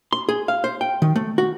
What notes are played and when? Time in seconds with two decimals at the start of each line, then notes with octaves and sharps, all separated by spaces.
0.13 C6
0.29 G#4
0.48 F5
0.64 C5
0.81 G5
1.02 D#3
1.16 A3
1.38 F#4